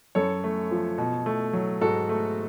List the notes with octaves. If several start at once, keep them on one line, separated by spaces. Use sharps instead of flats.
F#2 A4 C#5
A3
F3
B2
A3
F#3
G#2 F#4 A4
A3